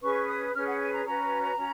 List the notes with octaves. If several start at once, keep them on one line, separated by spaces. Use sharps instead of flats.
C#4 G#4 B4 C#6
D#6
C#4 G#4 B4 F6
F#5
G#5
A#5
C#4 F#4 B4 A#5
C#4 F#4